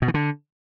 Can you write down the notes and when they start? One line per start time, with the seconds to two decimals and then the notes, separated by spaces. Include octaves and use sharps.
0.02 B2
0.08 E3
0.14 D3